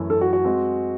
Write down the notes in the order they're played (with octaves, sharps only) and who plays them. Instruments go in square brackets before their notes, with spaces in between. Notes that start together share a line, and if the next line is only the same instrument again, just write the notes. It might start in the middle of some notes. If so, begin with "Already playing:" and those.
Already playing: [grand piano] F#2 E3 A3 C#4 E4
[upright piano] A4
F#4
F#4
[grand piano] G#3 C4